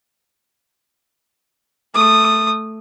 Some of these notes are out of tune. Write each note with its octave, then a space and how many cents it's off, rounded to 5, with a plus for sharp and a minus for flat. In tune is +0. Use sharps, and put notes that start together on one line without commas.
A3 +0 D#6 -15